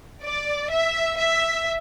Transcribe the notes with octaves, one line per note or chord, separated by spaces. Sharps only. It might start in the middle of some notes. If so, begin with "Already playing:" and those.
D5
E5
E5